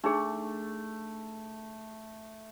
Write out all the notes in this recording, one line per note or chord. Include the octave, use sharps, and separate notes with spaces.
A3 D4 D#4 G#4